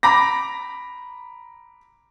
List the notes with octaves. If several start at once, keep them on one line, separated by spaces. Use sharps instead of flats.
A#5 B5 D6 A#6